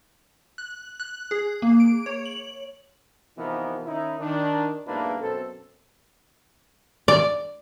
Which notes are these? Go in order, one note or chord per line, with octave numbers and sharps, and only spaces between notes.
F#6
F#6
G#4
A#3
D7
C#5
F#7
C3 E3 F3 B3 D#4 A#4
D#3 C#4 D#4 E4
D#3 D4
B1 G#2 A#3 D4 E4 B4
F#2 B2 C4 A4
D5